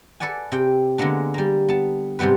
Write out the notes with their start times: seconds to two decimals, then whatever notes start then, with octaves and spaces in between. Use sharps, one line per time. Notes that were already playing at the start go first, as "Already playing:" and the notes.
0.20 A4 B4 D5 F#5 G#5
0.52 C3 G5
0.98 D3 G#3 A#3 B3 D4
1.34 G3 A#3
1.69 B3 A5
2.19 G#2 C3 G3 B3 B4